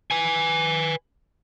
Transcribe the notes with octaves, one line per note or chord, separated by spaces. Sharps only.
B4 G#5